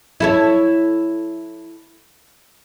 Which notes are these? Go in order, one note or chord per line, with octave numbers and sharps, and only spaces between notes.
E4 A4 C#5